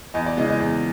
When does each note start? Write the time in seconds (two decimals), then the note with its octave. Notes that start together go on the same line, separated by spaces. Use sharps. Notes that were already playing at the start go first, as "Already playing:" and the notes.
0.14 E2 D#5
0.26 D5
0.37 C#3 E3 G#3 D#5
0.49 D#5
0.60 E2